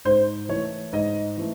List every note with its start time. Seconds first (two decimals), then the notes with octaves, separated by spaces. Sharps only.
0.05 G#2 C5
0.49 E3 A3 C#5
0.93 G#2 D#5
1.37 E3 A3